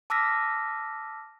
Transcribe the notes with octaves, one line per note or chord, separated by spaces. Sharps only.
A5 D6 E6 F6 A#6 B6